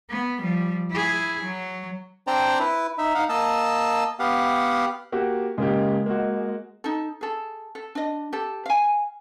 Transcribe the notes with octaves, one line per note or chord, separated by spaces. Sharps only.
B3
F3 G3
E4 G#4
F#3
C4 D4 C5 D5 G5 A#5
E4 B4
D#4 E5
D#4 F5 F#5
A#3 D#5 A5 E6
B3 G4 F5 F#5
A#3 F#4 G4
C#3 G#3 A#3 G4
A#3 F#4
D#4 A4
G#4 A4
A4
D4 D#5
G4 A4
F5 G#5